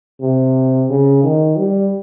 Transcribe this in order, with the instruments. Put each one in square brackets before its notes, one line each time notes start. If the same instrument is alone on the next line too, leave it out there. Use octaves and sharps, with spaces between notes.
[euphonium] C3
C#3
D#3
G3